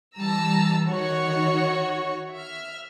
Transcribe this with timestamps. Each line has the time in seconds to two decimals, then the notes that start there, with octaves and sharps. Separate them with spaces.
0.17 E3 G3 A5 A#5 E6
0.89 D#3 F#4 C#5 C#6
2.35 E5 F6